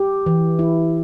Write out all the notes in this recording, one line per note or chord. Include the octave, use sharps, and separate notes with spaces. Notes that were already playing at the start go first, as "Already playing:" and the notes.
Already playing: G4
E3
E4